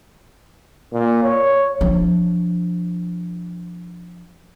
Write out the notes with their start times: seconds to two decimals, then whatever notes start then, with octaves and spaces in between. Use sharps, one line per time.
0.93 A#2
1.23 C#5
1.81 F3 D4